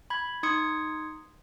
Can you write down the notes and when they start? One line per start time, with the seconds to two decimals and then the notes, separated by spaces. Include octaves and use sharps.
0.10 B5 G#6
0.43 D#4 C6 D#6 G#6 C#7